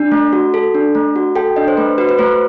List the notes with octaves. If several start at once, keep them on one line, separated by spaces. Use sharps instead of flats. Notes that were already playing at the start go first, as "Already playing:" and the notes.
Already playing: D4
A3
F#4
A4
D4
A3
F#4
A4 G5
D4 D#5
C5
A3 B4
F#4 B4
B4
A3 C5